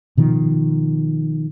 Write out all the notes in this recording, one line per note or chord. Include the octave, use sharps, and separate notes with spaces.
B2 D#3 F3